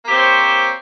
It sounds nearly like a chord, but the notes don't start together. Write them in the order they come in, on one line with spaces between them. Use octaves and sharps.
A#3 G4 C4 C5 C#5